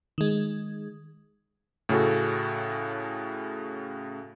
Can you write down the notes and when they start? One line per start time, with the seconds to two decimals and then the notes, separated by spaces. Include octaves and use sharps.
0.18 D#3 G#3
1.89 A2 C#3 C#4 F#4 A4